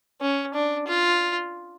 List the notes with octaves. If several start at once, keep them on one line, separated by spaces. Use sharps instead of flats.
C#4
D4
F4